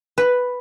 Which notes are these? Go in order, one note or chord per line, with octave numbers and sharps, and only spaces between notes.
B4